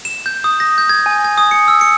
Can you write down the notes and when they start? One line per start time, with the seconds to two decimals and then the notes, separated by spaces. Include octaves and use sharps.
0.05 E7
0.26 G6
0.44 D#6
0.60 A#6
0.78 G6
0.89 G#6
1.06 G#5
1.24 G#6
1.38 D#6
1.51 C#7
1.68 E6
1.81 C#7